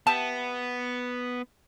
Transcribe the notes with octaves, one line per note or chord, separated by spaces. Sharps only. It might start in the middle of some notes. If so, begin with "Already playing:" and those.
B3 G4 E5 A5